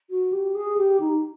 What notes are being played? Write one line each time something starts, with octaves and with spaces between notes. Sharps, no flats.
F#4
G4
G#4
G4
D#4